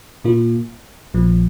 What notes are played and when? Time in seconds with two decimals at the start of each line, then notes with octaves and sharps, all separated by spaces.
0.24 A#2 A#3 F4
1.14 A#1 A#2 F3